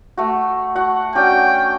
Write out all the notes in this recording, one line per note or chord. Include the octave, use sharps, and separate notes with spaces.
A3 F#4
F#4 F#5
C#4 D4 F#4 G5